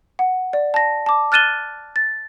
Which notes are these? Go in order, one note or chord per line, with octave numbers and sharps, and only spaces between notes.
F#5
D5
A5 A#6
A5 D6
F6 F#6 A6 D#7 E7 G7
A6